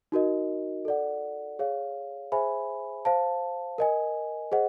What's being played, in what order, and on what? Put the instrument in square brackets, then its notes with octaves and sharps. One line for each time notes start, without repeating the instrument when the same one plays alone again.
[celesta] D#4 F#4 A#4 D#5
A4 D5 F#5
G#4 C#5 F5
G#4 C5 E5 G#5 B5
C5 F5 A5
A#4 D#5 G#5
G#4 C5 D#5 F#5